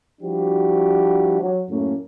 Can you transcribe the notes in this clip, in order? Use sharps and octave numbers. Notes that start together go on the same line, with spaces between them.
F3 G3 D4 E4 F#4 G4
F#3
F#2 A2 A3 A#3 C#4